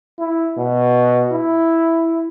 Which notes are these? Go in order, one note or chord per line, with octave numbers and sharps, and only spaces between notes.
E4
B2
E4